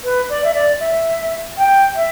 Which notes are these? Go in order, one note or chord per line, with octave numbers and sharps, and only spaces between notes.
B4
D5
E5
D5
E5
G5
E5